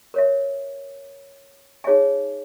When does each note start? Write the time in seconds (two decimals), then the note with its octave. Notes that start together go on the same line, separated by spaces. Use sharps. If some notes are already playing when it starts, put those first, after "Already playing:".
0.14 A#4 C#5 E5
1.84 D#4 G#4 C#5 E5 G#5